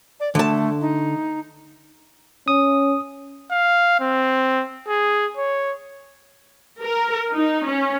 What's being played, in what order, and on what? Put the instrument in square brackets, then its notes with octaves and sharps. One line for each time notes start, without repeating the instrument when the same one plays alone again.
[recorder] D5
[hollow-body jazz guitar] D3 A5 [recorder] A3
[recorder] D#4
[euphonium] C#4 [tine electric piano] D#6
[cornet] F5
C4
G#4
C#5
[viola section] A#4
D#4
C#4